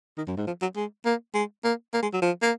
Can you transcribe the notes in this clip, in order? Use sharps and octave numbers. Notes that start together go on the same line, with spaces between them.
D#3
F#2
G#2
F3
F#3
G#3
A#3
G#3
A#3
A#3
G#3
F#3
F3
A#3